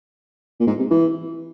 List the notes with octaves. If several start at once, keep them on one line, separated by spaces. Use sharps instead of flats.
A#2
G#2
C3
E3